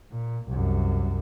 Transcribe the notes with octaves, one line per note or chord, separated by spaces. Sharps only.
A#2
C2 F#2